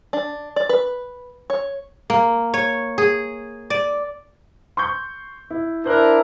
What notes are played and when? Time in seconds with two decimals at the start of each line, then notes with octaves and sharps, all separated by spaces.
0.13 D4
0.56 D5
0.69 B4
1.50 C#5
2.10 A#3
2.54 C#5
2.98 G#4
3.70 D5
4.77 C6 C#6 G6
5.50 E4
5.85 D4 E4 A#4 C5 F#6